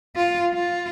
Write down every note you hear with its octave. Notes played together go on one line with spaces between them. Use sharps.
F4
F4